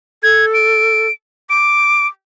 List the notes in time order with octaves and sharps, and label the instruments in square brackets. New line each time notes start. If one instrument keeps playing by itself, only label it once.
[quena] A4 [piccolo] G#6
[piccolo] D7
[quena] D6 [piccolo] D7